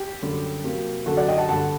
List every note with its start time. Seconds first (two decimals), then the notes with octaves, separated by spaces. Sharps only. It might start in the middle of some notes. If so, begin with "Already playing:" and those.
Already playing: G4
0.23 F#2 D3 G3
0.64 C3 F#3 A#3
1.06 F#2 D3 F#3 F#4 A4
1.17 D5 F#5
1.28 D#5 G5
1.38 F#5 A5
1.49 G2 D3 G3 F#5 A5